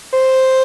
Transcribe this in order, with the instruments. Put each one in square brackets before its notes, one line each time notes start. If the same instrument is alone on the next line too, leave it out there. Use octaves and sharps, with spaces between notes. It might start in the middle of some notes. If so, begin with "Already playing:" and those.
[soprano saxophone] C5